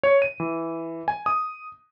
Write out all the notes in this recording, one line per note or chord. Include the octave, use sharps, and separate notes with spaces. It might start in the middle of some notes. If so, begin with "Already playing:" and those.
C#5
D#7
E3
G#5
D#6